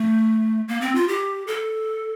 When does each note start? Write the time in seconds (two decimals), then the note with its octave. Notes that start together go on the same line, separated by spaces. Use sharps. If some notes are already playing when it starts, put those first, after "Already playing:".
Already playing: A3
0.68 A#3
0.81 C4
0.95 F4
1.08 G4
1.47 A4